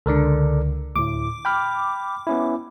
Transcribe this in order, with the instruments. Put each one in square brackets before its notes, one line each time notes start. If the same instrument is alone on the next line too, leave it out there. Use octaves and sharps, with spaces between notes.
[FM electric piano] C#2 D3 [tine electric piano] A4 A#4 D5
[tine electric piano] D2 A2 [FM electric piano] D6
[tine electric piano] G5 B5 F6
B3 C#4 E4